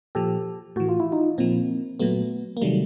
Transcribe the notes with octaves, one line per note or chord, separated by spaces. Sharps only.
A#2 F3 G4 A4
A2 E3 F#4
F4
E4
D#4 F4
A#2 F3 A#3 C4
A#2 F#3 A3 B3
A#3
C3 D#3 F#3 G3 A3